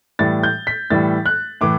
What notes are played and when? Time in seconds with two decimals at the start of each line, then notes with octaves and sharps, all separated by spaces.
0.19 A2 E3 G3 A6
0.43 G6
0.67 B6
0.90 A2 E3 G3 A6
1.26 F#6
1.61 A2 E3 D6